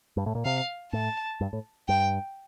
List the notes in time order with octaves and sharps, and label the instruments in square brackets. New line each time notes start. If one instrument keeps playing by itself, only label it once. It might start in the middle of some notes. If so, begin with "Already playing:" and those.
[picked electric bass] G2
A2
A#2
[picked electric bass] C3 [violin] F5
[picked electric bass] A2 [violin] A5
[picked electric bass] G2
A2
[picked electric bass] G2 [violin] G5